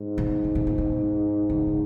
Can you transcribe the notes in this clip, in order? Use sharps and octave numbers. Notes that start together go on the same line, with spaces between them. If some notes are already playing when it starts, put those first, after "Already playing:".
Already playing: G#2
B2
C3
B2
A#2
B2
C#3
C#3